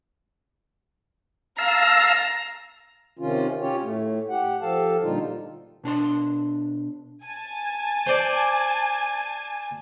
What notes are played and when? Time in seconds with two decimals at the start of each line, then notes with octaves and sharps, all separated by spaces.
1.58 F5 A5 A#5 E6
3.19 C3 D#3 C#4 F4
3.61 C#4 F4 G4 C#5
3.83 A2 A3
4.30 G4 F#5
4.62 F3 G4 A4 F5 A5
5.02 A#2 D3 G3 D#4 F4
5.84 B2 D4 C5 C6
7.24 G#5 A5
8.07 C5 D5